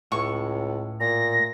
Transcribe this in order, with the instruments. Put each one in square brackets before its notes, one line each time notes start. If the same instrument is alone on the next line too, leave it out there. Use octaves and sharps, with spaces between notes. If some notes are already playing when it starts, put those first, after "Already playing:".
[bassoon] C#2 [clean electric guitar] A2 [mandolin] C#6
[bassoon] A#2 [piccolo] A#6